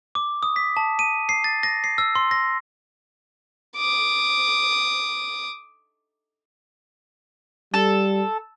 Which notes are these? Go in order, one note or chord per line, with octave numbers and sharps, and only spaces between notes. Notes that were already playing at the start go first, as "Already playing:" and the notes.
D6
D#6
B6
A5
D#7
C7
A6
A#6
C7
E6
C6
A#6
D6 D#6
G3 A4